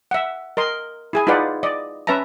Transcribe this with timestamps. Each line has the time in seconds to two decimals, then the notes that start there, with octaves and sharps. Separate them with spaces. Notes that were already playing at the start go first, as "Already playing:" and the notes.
0.11 E5 F#5
0.57 A#4 D#5 C6
1.13 E4 G#4 G#5
1.27 D#4 F4 G#4 B4 D5 F#5
1.63 D5 D#5
2.07 C#4 B4 E5 A5 A#5